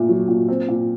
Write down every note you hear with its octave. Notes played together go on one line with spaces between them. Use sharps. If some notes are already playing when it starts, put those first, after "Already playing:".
Already playing: A#2 A3
F#3
A#2
C4
A#2